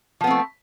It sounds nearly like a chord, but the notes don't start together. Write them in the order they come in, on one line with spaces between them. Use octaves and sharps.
F3 B3 C4 A3